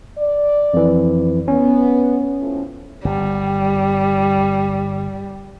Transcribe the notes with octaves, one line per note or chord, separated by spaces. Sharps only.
D5
F2 E3
B3 C#4
A2 F3
G1 G3